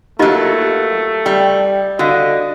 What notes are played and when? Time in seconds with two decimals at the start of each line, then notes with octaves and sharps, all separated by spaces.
0.19 F#3 A3 A#3 F4 G4 D#5
1.26 G3 G5
1.99 D3 F#4 D#5 F5